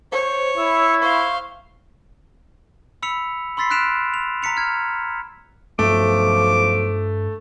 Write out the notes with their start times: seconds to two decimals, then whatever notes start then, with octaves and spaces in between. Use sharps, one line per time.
0.12 C5 C#5
0.57 E4 E6
1.02 C5 F5 C#6
3.02 B5 E6 B6 C#7 F7
3.57 B5 C6 E6 A6 B6 C7
3.70 F6 F#6 B6 D7 E7 F7
4.14 F7
4.43 A#5 B6 C#7 F7
4.57 F6 G#6
5.79 B1 G2 F3 A3 D6